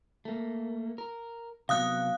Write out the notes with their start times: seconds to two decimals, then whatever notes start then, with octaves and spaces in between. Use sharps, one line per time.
0.25 A3 A#3
0.98 A#4
1.69 C3 F#3 B3 F5 D#6 F#6